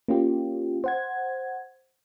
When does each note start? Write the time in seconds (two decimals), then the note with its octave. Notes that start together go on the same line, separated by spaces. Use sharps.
0.08 A#3 C#4 F4 G4
0.84 C5 F#5 G#6